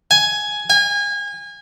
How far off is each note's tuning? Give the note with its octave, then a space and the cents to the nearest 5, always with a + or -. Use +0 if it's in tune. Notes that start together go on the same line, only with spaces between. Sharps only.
G#5 +10
G#5 -30